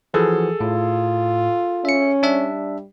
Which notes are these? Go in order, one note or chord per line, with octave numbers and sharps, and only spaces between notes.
E3 F3 F#4 G#4 A4
A2 F4
C#4 E5 C#7
G3 D4 E5